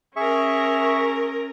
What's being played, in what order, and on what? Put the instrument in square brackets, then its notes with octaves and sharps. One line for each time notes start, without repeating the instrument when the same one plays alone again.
[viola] C#4 A#4 [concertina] G#4 E5 C#6